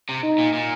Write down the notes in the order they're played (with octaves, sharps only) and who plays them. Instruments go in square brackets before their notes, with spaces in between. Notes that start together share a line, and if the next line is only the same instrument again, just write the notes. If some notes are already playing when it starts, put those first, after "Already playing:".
[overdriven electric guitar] C3
[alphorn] D#4
[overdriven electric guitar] A#2
A#2